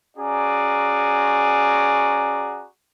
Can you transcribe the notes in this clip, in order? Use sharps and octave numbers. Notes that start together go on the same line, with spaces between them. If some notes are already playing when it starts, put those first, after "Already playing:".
C#4 F#4 G#4 D5 A#5